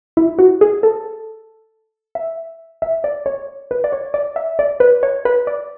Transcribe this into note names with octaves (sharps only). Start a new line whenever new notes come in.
E4
F#4
G#4
A4
E5
E5
D5
C#5
B4
D5
C#5
D5
E5
D5
B4
C#5
B4
D5